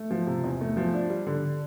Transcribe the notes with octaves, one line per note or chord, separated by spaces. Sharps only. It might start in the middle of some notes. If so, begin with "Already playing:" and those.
Already playing: A3
F3
C3
E2
A3
F3
D4
G3
D3